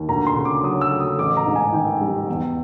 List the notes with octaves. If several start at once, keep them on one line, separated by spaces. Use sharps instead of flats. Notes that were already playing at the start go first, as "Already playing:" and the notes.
Already playing: D#2
D2 A#5
C6
C#3
D6
F#3 D#6
E6
A3
D#6
A1 D6
A#5
G#2
G#5
D#3 G5
G3
E2